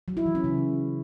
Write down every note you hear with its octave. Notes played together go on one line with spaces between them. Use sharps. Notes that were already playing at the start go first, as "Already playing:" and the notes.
F#3
E4
E3
C#4
C#3